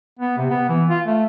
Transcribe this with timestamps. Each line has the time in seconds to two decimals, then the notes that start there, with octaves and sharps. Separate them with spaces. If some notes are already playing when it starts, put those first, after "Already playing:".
0.19 B3
0.37 C3
0.50 B3
0.69 E3
0.89 F4
1.05 A3